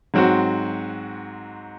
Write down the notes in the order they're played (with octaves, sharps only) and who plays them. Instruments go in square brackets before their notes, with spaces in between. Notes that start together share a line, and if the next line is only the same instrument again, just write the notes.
[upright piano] G#2 F#3 C4 F#4